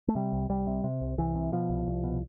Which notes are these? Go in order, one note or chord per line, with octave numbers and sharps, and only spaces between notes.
A3
C3 G3
C2
C2 G3
C3
C3
C2
C2 E3
C3
B2 F3
C2
C2
B2